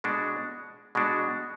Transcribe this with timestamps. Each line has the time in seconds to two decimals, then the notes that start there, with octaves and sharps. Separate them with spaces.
0.04 B2 G#3 D4 F#4
0.95 B2 G#3 D4 F#4